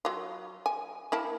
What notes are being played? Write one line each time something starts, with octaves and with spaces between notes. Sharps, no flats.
F#3 F4
G#5
A#3 E4 A5